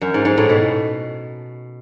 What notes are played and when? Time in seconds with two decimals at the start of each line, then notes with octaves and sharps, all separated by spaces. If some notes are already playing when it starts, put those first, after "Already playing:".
0.01 F#2
0.14 G#2
0.25 G#2
0.38 A2
0.49 B2